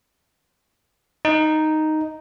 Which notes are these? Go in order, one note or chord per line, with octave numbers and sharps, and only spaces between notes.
D#4